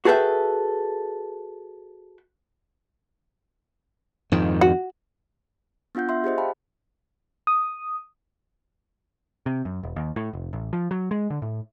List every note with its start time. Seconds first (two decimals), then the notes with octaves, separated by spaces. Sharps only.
0.05 F#4 G#4 A4 B4 E5 G5
4.32 F2 G#2 D#3
4.61 F#4
5.95 B3 D4 F4 F#5 G6
6.09 E5 C6
6.24 G4 G#4 C5 D#5
6.38 F5 G5 A5 B5
7.47 D#6
9.46 C3
9.65 F#2
9.83 E1
9.96 D#2
10.16 A2
10.33 F1
10.53 A1
10.73 F3
10.91 F#3
11.11 G#3
11.30 D3
11.42 A2